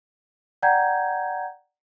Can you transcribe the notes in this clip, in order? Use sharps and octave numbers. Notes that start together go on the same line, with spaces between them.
D5 F#5 G5 A#5 G6 G#6